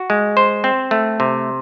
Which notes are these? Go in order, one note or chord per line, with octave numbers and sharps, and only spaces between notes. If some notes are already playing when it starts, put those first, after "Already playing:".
Already playing: F#4
G#3
C5
C4
A3
C3